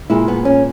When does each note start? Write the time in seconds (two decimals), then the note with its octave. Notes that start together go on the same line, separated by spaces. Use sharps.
0.10 A#2 G#3 E4
0.28 B3
0.45 C#4